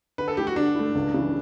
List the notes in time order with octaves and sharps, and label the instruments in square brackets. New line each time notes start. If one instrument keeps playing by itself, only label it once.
[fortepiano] D3 [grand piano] B4
[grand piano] A4
[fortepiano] A3 E4 [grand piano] G4
[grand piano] F#4
[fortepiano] D3 [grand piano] D4
[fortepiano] A3 E4
C#2
C#3 E3